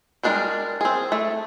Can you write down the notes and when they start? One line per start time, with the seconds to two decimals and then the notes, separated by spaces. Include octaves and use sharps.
0.23 G3 G#3 D4 A4 A#4
0.81 C4 G#4
1.12 A3